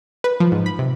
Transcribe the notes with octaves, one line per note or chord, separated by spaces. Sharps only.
B4
F3
G#2
B5
C3